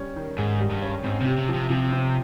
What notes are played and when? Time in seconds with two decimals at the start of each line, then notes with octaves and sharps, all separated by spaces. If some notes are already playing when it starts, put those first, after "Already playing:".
Already playing: G3 C#4
0.16 D#3
0.38 G#2 G#4
0.60 G3
0.70 G2
0.82 C#4
1.04 G#2 C4
1.21 C3 G4
1.37 C3
1.49 F3
1.54 C3
1.70 C3 F3
1.92 C4